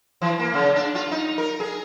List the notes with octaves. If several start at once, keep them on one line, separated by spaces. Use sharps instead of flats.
E3
A#3
C#3
D4
F4
D#4
A#4
G#4